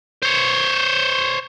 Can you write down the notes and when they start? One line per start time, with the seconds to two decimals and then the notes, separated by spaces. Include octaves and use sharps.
0.23 C5 C#5